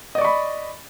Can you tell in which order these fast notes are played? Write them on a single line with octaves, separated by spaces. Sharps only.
D#5 D5 C#6 B5